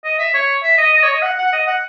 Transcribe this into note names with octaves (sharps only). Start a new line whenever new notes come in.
D#5
E5
C#5
E5
D#5
D#5
C#5
D#5
F#5
F#5
D#5
F#5